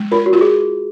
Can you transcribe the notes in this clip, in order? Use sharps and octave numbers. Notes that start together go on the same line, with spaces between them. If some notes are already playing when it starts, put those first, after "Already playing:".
Already playing: G#3
F4 A#4
F#4
F4
G#4